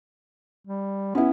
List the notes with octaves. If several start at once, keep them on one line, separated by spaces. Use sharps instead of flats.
G3
B3 C#4 E4